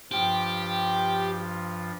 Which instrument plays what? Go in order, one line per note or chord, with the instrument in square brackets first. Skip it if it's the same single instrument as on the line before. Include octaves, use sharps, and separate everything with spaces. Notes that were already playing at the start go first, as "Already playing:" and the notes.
[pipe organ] G2 F3 F4 [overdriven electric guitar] G4